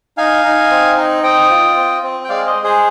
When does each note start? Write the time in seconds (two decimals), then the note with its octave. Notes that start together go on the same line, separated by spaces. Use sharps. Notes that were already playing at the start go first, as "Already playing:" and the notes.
0.18 D#4 F5 G#5
0.44 D#4
0.71 C4
0.98 D#4
1.23 C4 D#5 G5
1.50 F4
1.77 C4
2.03 C4
2.24 G5
2.29 G#3 D5 F5
2.46 C5 D#5
2.56 G#3
2.64 G#4 C5